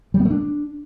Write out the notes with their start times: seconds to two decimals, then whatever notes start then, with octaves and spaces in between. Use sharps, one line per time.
0.14 G3
0.20 B3
0.25 A3
0.31 D4